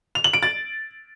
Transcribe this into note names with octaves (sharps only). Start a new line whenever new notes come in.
F7
F#7
D7
A6